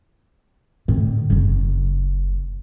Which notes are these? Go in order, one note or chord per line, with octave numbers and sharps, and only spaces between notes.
A2 D3
F#1 C#3